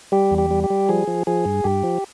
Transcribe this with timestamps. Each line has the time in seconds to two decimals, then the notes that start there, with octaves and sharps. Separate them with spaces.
0.12 G3 G4
0.31 E2
0.38 G4
0.51 G3
0.64 G4
0.70 G3
0.89 F3 G#4
1.07 F3
1.27 F3 G#4
1.45 G2
1.64 G2 G4
1.84 F3